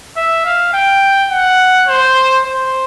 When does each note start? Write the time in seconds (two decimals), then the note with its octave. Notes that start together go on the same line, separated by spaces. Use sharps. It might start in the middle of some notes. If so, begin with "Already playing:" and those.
0.16 E5
0.45 F5
0.73 G5
1.30 F#5
1.88 C5
2.45 C5